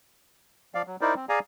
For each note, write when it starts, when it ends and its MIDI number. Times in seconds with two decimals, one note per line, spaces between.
0.75 0.82 53
0.75 0.82 74
0.75 0.82 77
0.87 0.96 54
1.01 1.14 63
1.01 1.14 64
1.01 1.14 70
1.01 1.14 72
1.01 1.14 74
1.16 1.25 60
1.29 1.39 68
1.29 1.39 74
1.29 1.39 77
1.29 1.39 80
1.29 1.39 82